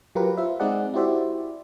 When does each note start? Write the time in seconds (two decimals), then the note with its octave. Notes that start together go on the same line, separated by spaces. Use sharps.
0.15 F#3 F4 G4 A#4 B4
0.37 F4 C5 E5
0.60 G#3 C4 D#4 G#4 D5 F#5
0.94 E4 F#4 G4 C5 D5 E5